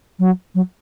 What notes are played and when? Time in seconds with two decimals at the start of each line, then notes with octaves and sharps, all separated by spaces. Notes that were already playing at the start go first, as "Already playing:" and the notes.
0.19 F#3
0.54 F#3